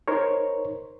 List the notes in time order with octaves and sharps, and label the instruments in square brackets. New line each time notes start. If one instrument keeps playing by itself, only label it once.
[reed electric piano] D#4 A#4 C5 C#5